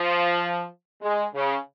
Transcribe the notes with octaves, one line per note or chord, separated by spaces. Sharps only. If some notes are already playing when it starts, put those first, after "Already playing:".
Already playing: F3
G#3
C#3